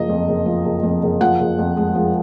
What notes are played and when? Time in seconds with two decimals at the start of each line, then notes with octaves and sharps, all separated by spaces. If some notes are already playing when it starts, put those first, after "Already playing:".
Already playing: F#1 F3 D#5
0.09 F2
0.28 F#1
0.46 F3
0.65 F#1
0.83 F2
1.03 F#1
1.21 F3 F#5
1.40 F#1
1.58 F2
1.77 G#3
1.95 F3